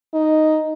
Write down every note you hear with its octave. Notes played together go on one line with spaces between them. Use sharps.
D#4